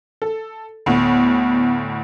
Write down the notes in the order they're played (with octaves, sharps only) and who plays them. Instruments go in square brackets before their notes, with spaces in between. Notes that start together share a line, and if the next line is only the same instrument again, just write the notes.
[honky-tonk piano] A4
[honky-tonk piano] D2 A2 [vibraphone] B3